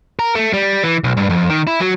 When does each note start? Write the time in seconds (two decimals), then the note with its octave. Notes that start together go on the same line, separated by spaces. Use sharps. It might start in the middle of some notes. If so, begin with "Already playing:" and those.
0.19 A#4
0.35 A3
0.53 G3
0.83 E3
1.04 B1
1.17 G2
1.30 F2
1.50 D#3
1.67 E4
1.80 F#3